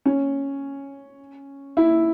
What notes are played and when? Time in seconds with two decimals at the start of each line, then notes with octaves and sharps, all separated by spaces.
0.06 C#4
1.77 E4